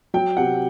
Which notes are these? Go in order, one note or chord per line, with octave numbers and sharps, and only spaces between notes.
F#3 G5
C3 F#5